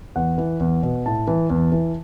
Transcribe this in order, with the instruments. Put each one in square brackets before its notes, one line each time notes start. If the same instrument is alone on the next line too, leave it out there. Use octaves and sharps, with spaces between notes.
[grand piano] E2 F#5
E3
E2
B2
A2 A5
E3
E2
E3